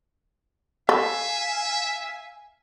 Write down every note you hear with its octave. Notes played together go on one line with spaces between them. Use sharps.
A4 E5 F5 G#5